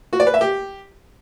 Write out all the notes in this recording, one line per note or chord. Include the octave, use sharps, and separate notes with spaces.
F#4
D5
B4
E5
G4